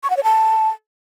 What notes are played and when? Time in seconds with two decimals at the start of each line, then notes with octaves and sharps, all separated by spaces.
0.03 C#6
0.10 F#5
0.17 C#5
0.24 A5